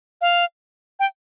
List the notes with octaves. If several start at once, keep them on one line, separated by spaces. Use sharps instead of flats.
F5
G5